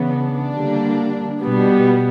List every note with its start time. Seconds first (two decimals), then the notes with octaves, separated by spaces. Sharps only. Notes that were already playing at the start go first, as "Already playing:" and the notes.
Already playing: C#3 E3 B3
0.10 D4
0.54 D3 G3 A#3
1.41 B2 G3 B3